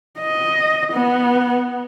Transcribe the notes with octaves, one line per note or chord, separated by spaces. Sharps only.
D#5
B3